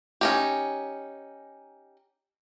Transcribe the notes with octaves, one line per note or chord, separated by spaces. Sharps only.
C#4 D#4 G4